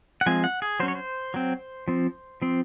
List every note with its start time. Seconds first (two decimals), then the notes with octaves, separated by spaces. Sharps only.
0.21 F#5
0.26 F3 G#3 C4 G#5
0.44 F#5
0.62 G#4
0.80 F#3 C#4 C5
0.88 C#5
0.95 C5
1.34 F#3 C4
1.88 F3 C4
2.42 F3 C4